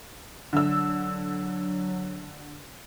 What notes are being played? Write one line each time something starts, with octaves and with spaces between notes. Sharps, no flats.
D3 F#3 E6